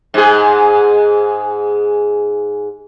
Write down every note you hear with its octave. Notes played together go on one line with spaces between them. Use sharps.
G#2 G#4